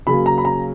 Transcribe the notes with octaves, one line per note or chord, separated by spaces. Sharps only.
C#3 F#3 A#3 B5
A#5
B5
A#5